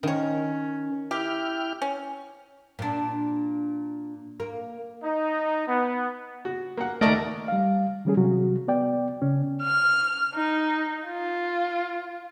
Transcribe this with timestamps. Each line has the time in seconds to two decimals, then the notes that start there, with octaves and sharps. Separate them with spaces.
0.03 D#3 C#4 C#5
1.11 E4 G4 G5 F6
1.82 C#4
2.79 A#2 D4
4.40 A#3
5.03 D#4
5.68 B3
6.45 F#4
6.77 A#3 F#5
7.01 D#2 A3 A#4 D5 D#5
7.48 G3 F5
8.05 D#3 G3 C#4 G#4
8.17 C3 F#3 F#4
8.68 B3 D5 G5
9.22 C#3 C#4
9.63 F6
10.35 D#4
11.08 F4